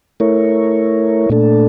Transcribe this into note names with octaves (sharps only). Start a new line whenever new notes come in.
A3 E4 A#4 C#5
A#2 A3 D4 A4